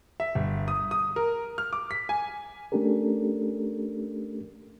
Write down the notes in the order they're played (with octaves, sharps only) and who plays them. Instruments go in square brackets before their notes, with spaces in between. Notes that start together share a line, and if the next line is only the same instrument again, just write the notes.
[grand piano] E5
G1
D#6
D#6
A#4
F6
D6
B6
G#5
[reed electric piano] A3 C#4 D4 G4 A4 A#4